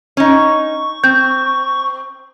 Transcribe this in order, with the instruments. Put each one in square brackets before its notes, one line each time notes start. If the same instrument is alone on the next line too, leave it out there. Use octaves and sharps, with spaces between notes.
[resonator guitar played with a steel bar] C#4 D#4 [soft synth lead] C#6
[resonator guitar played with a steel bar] C4 [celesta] G6